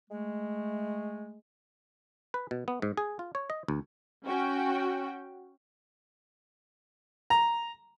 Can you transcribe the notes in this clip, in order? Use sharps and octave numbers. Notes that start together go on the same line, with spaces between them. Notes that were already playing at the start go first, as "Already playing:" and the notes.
G#3 A3
B4
B2
B3
G#2
G#4
F4
C#5
D#5
D2
C#4 F#4 G5
A#5